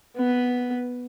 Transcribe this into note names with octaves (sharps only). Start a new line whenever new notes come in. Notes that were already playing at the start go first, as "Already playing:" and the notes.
B3 B4